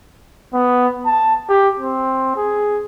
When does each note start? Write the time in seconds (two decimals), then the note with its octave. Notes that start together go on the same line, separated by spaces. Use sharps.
0.53 B3
1.06 A5
1.49 G4
1.79 C4
2.36 G#4